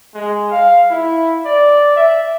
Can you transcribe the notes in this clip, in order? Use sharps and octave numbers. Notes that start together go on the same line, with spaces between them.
G#3
F5
E4
D5
E5